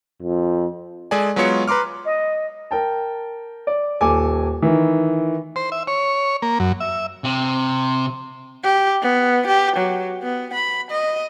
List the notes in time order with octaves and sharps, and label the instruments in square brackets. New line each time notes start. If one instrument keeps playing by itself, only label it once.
[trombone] F2
[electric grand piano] G#3 G#4 A4 D5 G#5
F#3 G#3 B3 F4 C#5 C#7
B4 A#5 C6 D6 F6
[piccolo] D#5
[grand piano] A#4 G5 A5
D5
D#1 A4 G#5 D6
D#3 E3
[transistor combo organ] C5
E5
C#5
A#3
F#2
E5
[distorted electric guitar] C3
[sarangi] G4
B3
G4
F#3
B3
B5
D#5